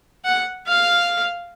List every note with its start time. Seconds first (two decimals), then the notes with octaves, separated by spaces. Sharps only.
0.25 F#5
0.67 F5